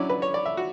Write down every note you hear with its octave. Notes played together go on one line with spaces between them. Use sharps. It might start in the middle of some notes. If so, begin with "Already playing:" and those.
Already playing: F#3 C#4 D4 E4 D5
B4
C#5
D5
E5
F#4